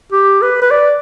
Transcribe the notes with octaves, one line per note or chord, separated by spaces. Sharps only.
G4
B4
B4
D5